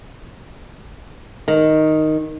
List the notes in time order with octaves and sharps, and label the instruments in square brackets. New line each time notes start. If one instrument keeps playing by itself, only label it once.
[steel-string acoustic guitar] D#3